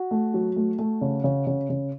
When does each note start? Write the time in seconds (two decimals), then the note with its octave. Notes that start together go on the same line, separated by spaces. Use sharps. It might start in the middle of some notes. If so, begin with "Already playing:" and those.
Already playing: F#4
0.11 A3
0.34 F#3
0.56 A3
0.79 A3
1.01 C#3
1.24 C#3
1.47 C#3
1.70 C#3